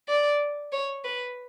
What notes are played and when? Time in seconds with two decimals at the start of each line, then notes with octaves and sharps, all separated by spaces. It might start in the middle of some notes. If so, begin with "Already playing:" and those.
0.09 D5
0.72 C#5
1.04 B4